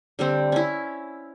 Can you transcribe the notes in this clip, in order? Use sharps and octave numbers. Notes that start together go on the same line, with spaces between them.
D3 G3 C4
C#4 E4